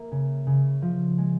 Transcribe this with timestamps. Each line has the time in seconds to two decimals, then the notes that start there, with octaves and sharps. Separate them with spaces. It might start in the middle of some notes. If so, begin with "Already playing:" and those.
Already playing: A#3 E5
0.11 C#3
0.47 C#3
0.82 F3
1.18 G#3